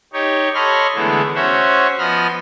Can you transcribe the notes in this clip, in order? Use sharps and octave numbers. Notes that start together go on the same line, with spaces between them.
D#4 G4 C#5
A4 C#5 D#5 B5 C6 F6
D3 E3 G#3 A3 B3 E4
C#4 F#4 C5 C#5 E5
F3 B3 D#5 B5 D#6 F6